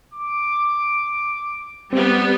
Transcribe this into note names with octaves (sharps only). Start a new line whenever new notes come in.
D6
G3 B3 C4